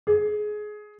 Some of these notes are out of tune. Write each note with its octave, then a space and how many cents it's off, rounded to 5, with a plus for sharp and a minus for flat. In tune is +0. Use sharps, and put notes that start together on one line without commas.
G#4 +20